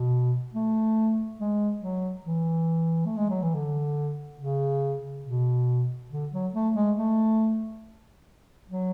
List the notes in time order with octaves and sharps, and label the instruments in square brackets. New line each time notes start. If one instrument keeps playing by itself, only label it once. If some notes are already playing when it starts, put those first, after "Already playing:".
Already playing: [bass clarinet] B2
A3
G#3
F#3
E3
A3
G#3
F#3
E3
D3
C#3
B2
D3
F#3
A3
G#3
A3
F#3